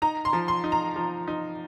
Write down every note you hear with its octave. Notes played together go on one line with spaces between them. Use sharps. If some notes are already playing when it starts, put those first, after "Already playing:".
D#4 A#5
C6
F3
C6
D#4
A#5
F3
D#4